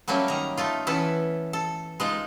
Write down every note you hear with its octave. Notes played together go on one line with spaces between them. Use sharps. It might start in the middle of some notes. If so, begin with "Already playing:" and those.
F#3 G3 A3 A#3 C#4
D#3 A#5
A3 D#4 F4
E3 B3 C#4 E4 A4
A4
G#3 D#4 F4